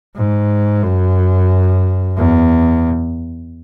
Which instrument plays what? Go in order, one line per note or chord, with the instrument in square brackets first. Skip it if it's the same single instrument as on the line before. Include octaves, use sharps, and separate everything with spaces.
[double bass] G#2
F#2
E2